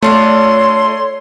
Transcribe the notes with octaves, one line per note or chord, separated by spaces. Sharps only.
A3 D4 F4 A4 C#5 C6